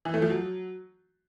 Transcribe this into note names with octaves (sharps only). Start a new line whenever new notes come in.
E3
A3
F3
F#3